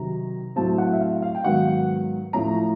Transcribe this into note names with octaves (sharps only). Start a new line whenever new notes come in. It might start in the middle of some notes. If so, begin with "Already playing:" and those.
Already playing: C3 D#3 F#3 A#5
A2 F#3 A3 C4 A5
F#5
E5
F5
F5
G5
G#2 D#3 F#3 B3 F#5
A2 F3 A3 C#4 A#5